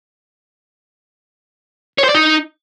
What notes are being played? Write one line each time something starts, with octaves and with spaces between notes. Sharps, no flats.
C#5
C5
D5
D#4